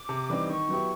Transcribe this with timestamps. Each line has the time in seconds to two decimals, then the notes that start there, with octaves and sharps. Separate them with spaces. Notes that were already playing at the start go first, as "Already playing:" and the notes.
Already playing: D6
0.09 C3
0.30 E3 G3 C4 D#4
0.49 D#3 C#6
0.69 F#3 B3 E4 G4